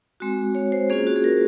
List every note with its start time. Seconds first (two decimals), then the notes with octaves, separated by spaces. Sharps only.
0.20 G#3 C4 F#4
0.55 C#5
0.72 C5
0.90 A#3 C#4 F4 G#4
1.07 F#4
1.16 G#4
1.24 A#4